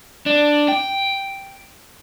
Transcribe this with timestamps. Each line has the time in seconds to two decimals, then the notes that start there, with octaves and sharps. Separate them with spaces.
0.26 D4
0.68 G5